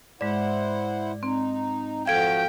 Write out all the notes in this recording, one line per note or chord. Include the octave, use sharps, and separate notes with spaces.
G#2 G#3 E4 C5 D5 F#5
C4 D#4
F3 F#4 A4 F5 G5 G#6 D7